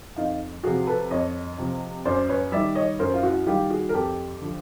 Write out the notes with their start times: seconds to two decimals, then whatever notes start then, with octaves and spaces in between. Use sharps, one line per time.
0.16 F2 D#4 F4
0.63 C3 F3 F#4 G#4
0.87 A4 B4
1.11 F2 C#5 D#5
1.58 C3 F3
2.05 F#2 C5 D5
2.29 B4 C#5
2.52 D#3 G3 D5 E5
2.75 C#5 D#5
2.99 F#2 A#4 C5
3.14 F4
3.23 E4 F#4
3.46 D#3 G3 F4 G4
3.70 F#4 G#4
3.89 A#4
3.94 F2 G4 A4
4.41 D3 F3